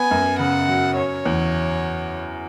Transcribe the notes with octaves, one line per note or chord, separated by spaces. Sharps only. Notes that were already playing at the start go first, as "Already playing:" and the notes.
Already playing: B3 G#5
F#2
C#3 F#5
F#3
C#4 C#5
E2